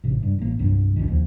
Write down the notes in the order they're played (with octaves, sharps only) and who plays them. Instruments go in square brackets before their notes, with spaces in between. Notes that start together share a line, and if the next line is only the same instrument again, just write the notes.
[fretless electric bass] A1 C3
G2
A1 A#3
C2 G2 F#3
G#1 C#2 D#3
D#2 F3 G#3 A#3